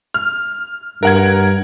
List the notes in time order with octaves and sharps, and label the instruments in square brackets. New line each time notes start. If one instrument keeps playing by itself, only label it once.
[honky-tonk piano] F6
[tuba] G2 [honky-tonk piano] A#4 F#5 G#6